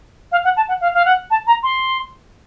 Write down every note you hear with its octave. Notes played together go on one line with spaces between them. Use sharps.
F5
F#5
A5
F#5
F5
F5
F#5
A5
A#5
C6